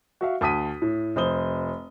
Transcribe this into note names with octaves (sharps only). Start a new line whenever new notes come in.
F#4 E5 F5
D2 A5 D#6 B6 D#7
A2
F1 C5 D#6 G7